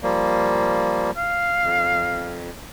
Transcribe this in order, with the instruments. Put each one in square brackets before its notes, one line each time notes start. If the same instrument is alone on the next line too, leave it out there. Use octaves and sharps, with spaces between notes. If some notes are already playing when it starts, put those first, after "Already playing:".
[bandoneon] F3 G3 A#3
[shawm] F5
[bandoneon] F2